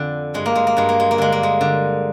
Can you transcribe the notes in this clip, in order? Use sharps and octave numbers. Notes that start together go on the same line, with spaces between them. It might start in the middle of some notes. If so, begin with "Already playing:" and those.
Already playing: F2 D3
G2 G#3
A#3
G#3
A#3
G2 G#3
A#3
G#3
A#3
D3 G#3
A#3
G#3
D3